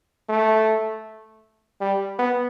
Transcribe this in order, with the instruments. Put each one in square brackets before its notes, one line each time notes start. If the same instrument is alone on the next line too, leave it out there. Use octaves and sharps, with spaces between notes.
[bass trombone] A3
G3
B3